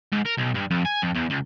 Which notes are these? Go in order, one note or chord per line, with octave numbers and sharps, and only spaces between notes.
G#2
A#4
B1
G2
F2
G#5
F2
E2
C#2